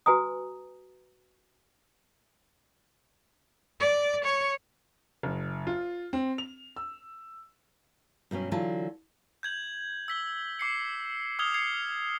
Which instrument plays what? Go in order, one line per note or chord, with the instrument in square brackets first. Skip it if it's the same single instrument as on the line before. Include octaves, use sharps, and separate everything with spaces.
[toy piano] F#4 B4 G#5 A#5 D#6
[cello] D5
C#5
[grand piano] F#1
F4
C4
F7
E6
[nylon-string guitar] G2 B2 F#3 C#4
D3 E3 F#3 F4 A5
[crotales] G6 G#6 F#7
E6 B6 G7
D6 C7 C#7
D#6 F6 G#6 C7 F7 G7
G#6 C7 C#7